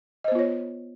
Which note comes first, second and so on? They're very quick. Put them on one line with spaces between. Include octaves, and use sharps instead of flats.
D#5 C5 B3 F4 C#5